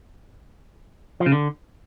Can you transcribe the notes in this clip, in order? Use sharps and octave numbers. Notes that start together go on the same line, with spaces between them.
F3
C#3
D3